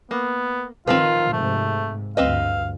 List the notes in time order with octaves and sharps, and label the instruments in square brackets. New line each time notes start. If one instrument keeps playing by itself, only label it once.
[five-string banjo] A#3 [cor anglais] B3
[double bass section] D#3 F3 [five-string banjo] C4 A#4 B4 [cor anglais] F4
[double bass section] G#2 C3 [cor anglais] A3
[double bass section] D2 G2 [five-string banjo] C4 B4 D#5 [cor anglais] F5